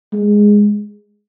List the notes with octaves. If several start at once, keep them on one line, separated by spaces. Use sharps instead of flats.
G#3